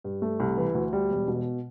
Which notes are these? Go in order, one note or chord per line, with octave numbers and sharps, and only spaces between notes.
G2
A3
C2
E3
D2
G3
E1
B2